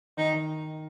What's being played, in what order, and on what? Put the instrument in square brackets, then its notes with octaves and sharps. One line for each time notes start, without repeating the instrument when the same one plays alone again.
[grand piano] D#3 [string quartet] D#4
[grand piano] D#3